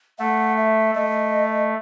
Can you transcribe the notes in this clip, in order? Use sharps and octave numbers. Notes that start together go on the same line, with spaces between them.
A3 F#5
E5
A3 D#5